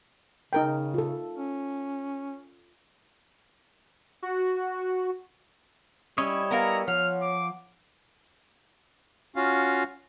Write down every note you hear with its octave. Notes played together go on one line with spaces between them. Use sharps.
C#3 D#4 A#4 G5
F4 A4
C#4
F#4
G3 C#4 E4 C#5 D#5
B3 A#4 F5 A#5
F3 C#5 F#5 F6
D6
C#4 F4 F#4 F5